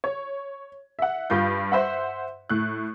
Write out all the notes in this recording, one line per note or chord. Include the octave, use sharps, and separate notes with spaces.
C#5
E5 F#5
G2 F4 G6
C5 E5 F#5
A2 F#6